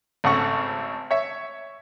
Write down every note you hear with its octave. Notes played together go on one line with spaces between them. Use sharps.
G#1 C#3 A3 F#5 C#6
C#5 E5